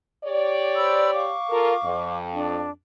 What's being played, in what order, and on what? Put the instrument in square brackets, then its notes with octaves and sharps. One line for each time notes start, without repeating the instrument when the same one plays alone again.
[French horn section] G4 C#5 D5
[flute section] C5 B5 E6
F5 C#6 D6
[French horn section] F4 A4 A#4
F2
[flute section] D4